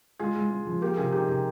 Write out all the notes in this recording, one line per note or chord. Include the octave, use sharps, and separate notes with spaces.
G#3 F4 G#4
G#3
G#3
F3
A#3 G4 A#4
C3 F4 G#4
D#4 G4
C3 G4